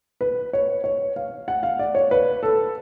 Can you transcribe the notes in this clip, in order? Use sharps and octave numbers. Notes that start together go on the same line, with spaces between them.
B4
C#5
C#5
F5
F#5
F5
D5
C#5
B4
A4